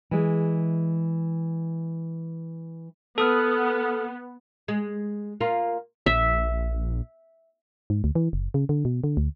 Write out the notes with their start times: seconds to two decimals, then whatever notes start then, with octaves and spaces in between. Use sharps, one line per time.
0.11 E3 G#3
3.18 B3 A4 D#6 F6
4.68 G#3
5.41 A#3 F4
6.06 A#1 E5
7.90 G#2
8.04 D2
8.15 E3
8.33 F#1
8.54 C#3
8.69 D3
8.85 B2
9.04 D3
9.17 D2